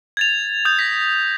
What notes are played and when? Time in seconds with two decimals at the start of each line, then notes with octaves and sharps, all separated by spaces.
0.17 G#6 A6 F7
0.65 D#6 G6 F7
0.79 A#6 B6